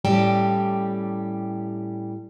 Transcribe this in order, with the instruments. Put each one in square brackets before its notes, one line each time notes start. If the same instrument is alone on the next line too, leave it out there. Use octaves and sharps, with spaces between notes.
[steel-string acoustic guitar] A2 G3 C#4 G4 G5 A5